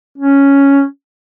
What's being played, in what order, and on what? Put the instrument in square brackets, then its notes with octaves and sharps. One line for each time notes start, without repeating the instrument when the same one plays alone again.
[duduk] C#4